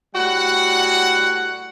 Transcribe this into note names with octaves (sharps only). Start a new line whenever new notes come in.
A2 G3 F#4 F#5